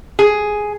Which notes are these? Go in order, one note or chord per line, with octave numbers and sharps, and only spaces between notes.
G#4